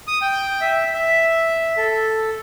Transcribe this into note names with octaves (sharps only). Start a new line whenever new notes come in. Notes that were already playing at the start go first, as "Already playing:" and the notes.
D#6
G5
E5
E5
A4